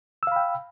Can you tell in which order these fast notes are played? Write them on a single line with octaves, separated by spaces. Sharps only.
E6 F5 B5 G5